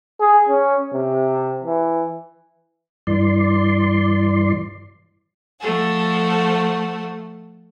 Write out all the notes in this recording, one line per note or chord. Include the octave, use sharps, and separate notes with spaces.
G#4
C#4
C3
E3
G2 E3 D5 C6
F3 A3 A4 F#5